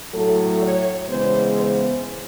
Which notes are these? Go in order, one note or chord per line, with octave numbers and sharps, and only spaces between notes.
A2 F#3 A3 A4
C#5
C#3 E3 G#3 B3 C5
C5